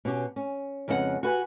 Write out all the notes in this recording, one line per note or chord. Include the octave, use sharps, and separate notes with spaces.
B2 C#4 G4
C#4
F2 C#3 G#3 B3 A4 F#5
F#4 G4 B4 F#5 G#5